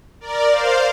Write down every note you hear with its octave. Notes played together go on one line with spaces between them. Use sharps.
A#4 D5
C5 F5